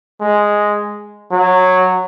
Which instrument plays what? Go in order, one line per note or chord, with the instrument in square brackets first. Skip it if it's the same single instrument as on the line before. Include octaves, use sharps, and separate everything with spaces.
[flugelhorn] G#3
F#3